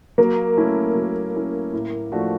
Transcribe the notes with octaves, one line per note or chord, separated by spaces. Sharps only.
F#3 A#3
A3 C#4 E4
F#3
A3 C#4 E4
A2
F3 A3 D4 F#4